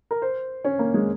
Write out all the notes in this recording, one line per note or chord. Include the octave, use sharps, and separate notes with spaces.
A#4
C5
C#4
A#3
G#3